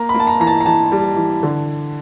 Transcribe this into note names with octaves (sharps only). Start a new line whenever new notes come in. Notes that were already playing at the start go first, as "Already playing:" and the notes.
Already playing: A#3 A#5
B5
A#3
A5
A#5
E3 A#5
A5
A#5
E3 A5
G3
E3
D3